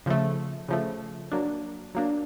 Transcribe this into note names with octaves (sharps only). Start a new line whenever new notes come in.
C#3 F3 A3
C#3 F3 A3
F#3 A#3 D4
F#3 A#3 D4